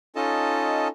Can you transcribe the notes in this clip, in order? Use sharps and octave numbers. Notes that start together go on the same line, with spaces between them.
C#4 D#4 F4 A4 D#5 A5